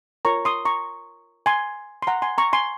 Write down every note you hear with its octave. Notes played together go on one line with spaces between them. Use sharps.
F4 A#4 C#5 A#5 C#6
C6 D#6
A#5 C#6
G#5 C6
C6
F#5 A#5
G#5 C6
A#5 C#6
G#5 C6